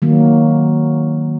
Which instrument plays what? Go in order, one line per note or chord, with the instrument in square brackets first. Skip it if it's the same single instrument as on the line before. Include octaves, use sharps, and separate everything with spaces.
[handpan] D#3 F#3 A#3